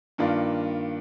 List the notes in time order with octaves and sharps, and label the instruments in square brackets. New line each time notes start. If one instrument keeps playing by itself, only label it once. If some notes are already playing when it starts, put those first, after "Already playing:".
[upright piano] G2 D#3 A#3 D4 F4